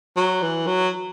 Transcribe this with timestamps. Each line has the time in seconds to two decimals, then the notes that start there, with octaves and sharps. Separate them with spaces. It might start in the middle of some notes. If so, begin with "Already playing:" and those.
0.17 F#3
0.42 E3
0.67 F#3